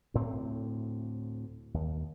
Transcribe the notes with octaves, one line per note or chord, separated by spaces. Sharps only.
D2 A2 C4
D#2